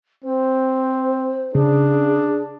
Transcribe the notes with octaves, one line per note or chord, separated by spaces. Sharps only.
C4 C5
C#3 D4 G#4